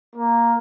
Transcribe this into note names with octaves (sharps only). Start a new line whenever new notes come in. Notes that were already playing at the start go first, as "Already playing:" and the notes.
A#3